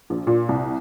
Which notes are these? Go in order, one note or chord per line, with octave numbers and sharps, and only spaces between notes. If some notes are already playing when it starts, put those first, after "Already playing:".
A#1
A#2
C2